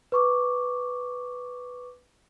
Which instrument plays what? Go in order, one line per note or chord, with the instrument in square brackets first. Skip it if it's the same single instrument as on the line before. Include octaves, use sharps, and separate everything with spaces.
[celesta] B4 C#6 D6